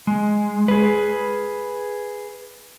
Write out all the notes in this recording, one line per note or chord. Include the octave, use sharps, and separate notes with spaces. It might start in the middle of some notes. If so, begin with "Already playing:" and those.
G#3
G#4 B4